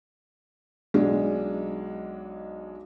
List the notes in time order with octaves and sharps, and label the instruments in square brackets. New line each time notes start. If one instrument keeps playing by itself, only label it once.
[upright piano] B1 G#3 D4